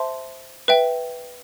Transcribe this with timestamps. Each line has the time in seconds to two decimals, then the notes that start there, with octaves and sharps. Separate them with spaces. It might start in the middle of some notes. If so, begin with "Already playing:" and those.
Already playing: C5 E5 A5 C6
0.68 B4 E5 G5